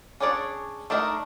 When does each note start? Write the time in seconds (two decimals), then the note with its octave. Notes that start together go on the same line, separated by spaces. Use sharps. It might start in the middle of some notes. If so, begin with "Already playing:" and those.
0.20 C#4 D4 G#4 C#5 D5
0.90 A3 D4 D#4 A#4